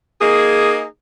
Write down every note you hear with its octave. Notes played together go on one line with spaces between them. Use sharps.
A#3 D#4 G#4